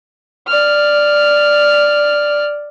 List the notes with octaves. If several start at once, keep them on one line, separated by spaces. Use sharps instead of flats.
D5 F6